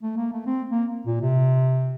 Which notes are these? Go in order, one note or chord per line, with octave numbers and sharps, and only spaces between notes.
A3
A#3
A3
C4
A#3
A#2
C3